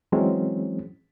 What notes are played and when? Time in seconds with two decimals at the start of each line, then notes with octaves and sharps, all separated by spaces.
0.12 E3 F#3 G#3 C4 C#4